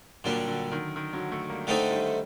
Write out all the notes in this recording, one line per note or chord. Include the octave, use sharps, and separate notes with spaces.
A#2 D3 F#3 G3 D4
D3 F#3
D#3
D#3
D3 F#3
F#3 A3
G3 A#3
D3 A3 C4 D#4 A4
D#3 G3